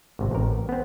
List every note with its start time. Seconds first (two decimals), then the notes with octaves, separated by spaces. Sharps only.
0.19 G#1 C3
0.31 A1 A#4
0.69 B3 C4